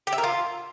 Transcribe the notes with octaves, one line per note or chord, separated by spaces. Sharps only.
G4
E5
A#4
F4